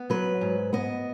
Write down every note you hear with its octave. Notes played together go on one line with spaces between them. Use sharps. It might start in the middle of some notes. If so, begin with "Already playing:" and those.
Already playing: B3
F#3 B4
G#2
B3 D#5